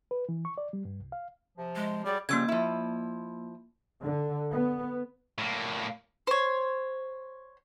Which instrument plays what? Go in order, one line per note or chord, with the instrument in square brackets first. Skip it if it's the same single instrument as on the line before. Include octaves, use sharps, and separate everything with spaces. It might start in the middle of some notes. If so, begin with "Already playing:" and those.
[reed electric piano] B4
E3
C#6
D5
G3
G2
C2
F5
[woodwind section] C3 F3
[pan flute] G#3
[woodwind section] F#3 G#4 [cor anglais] G3 [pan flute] D5
[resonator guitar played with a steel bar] C#3 F3 G3 [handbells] A#3 E6 G#6
[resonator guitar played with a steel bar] F3 E4
[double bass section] D3
B3
[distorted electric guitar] A2 A#3
[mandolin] C5 C#5